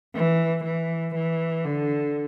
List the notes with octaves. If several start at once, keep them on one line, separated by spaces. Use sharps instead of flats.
E3
E3
E3
D3